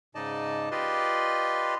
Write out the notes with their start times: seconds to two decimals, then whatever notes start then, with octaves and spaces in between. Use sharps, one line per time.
0.15 G#2 C#3 D#4 D5 D#5 A5
0.71 F4 G4 B4 D5 D#5 C6